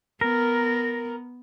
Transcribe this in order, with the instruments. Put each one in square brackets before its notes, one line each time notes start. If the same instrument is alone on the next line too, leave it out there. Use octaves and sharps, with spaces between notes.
[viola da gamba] B3 [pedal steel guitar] A#4